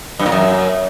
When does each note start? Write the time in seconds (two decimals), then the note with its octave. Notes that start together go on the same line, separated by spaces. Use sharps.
0.19 G2
0.26 A#2
0.32 F#2